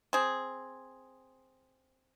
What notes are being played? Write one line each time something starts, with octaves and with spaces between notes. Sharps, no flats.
C4 G#4